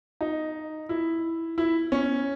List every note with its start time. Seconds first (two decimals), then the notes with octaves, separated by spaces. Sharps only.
0.21 D#4
0.89 E4
1.58 E4
1.92 C#4